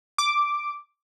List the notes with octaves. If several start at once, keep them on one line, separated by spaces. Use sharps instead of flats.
D6